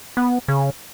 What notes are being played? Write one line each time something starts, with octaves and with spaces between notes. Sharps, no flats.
B3
C#3